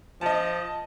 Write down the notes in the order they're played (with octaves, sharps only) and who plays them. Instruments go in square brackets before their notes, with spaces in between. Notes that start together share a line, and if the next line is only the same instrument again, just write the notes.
[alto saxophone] F3 [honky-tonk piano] D#5 A5